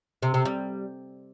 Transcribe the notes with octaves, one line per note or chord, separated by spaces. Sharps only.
C3
C3
G3